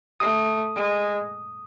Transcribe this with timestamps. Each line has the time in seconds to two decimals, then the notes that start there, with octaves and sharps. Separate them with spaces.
0.20 A3 D#6
0.75 G#3